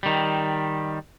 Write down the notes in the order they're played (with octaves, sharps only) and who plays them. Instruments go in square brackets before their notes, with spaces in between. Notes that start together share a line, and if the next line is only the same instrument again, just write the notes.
[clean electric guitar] D#3 G3